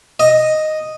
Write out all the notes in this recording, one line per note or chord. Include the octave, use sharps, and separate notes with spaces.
D#5